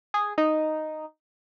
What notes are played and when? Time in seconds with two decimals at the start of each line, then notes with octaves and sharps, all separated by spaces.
0.14 G#4
0.38 D#4